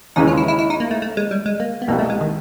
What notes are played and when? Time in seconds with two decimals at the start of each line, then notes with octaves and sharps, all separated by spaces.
0.16 D#2 C#3 E3 G#3 D#4
0.28 F4
0.37 E4
0.48 E4
0.59 E4
0.70 D#4
0.80 A#3
0.91 A3
1.02 A3
1.17 G#3
1.31 G3
1.46 G#3
1.60 A#3
1.82 B3
1.88 C2 B2 G3 A#3
1.99 A3
2.10 G#3
2.21 D#3